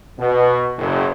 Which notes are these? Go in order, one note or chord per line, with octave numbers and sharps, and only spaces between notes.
B2
F#1